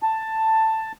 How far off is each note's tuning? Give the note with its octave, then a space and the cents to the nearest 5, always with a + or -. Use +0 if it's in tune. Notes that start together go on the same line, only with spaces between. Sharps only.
A5 +10